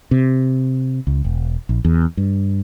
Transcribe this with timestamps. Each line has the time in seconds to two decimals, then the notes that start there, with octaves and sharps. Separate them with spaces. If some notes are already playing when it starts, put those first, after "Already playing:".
0.11 C3
1.07 C#2
1.25 E1
1.69 A#1
1.85 E2
2.17 G2